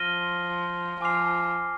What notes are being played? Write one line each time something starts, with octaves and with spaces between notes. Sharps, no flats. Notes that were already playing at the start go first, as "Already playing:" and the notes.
Already playing: F3 F6 A#6 D#7 G7
F3 G#5 D6 F6 C7 F7